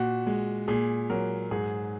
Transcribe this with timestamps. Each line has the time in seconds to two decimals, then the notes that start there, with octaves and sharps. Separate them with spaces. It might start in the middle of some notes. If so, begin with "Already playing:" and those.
Already playing: A#2 F#4
0.27 G#3
0.68 A#2 G#4
1.10 F#3 A#4
1.51 G#2 G#4